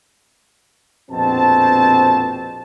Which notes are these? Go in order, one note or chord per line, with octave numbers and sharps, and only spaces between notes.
A#1 F2 B2 C4 A5